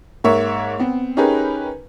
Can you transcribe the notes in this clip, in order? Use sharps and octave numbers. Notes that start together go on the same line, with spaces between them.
G#2 A#3 C#5 E5
B3 C4
C#4 D#4 G4 G#4 A#4 B4